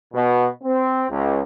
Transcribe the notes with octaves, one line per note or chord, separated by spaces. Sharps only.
B2
C4
C#2